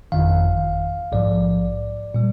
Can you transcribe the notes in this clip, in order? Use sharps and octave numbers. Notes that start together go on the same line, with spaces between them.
G1 F2 D#3 F5
A#1 G#2 F3 D5
A#2 G3